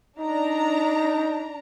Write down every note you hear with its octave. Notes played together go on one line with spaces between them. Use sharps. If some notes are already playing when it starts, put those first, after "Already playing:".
D4 D#4 A#5